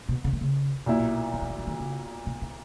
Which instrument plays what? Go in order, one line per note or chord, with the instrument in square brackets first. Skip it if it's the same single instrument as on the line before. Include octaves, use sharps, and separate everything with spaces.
[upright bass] B2
C#3
D#3
C#3
[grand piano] B1 A#2 A#3 E4
[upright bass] D#3
E3
D#3
E3
D#3
C#3
B2
A#2